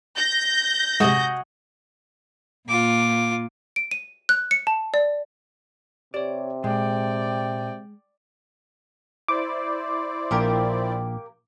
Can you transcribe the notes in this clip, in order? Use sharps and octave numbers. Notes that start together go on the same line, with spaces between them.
G6 A#6
G#2 C3 F#4 G#4 D#5
A#2 F4 D6
D7
D#7
F#6
C#7
A5
D5
C3 G4 C#5 D5
A#2 G#3 D5 G5
E4 C5 D5 D6
A#1 A#3 G4 A#4